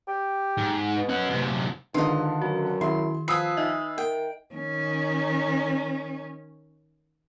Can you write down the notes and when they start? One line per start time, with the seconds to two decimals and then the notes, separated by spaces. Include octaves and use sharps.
0.08 G4
0.58 G#2
0.96 B2
1.09 C#4 F#5
1.30 F#2 C3
1.94 G#2 D3 D#3 F4 B4 D#5
2.41 F#2 F#4
2.81 D#3 E4 C6
3.28 F3 B4 G#5 D#6 E6 C7
3.57 D#4 D#5 E5
3.98 A#4 G5
4.54 D#3 C#4